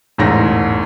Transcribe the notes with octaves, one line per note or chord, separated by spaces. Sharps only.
E1 A1 G#2 A#6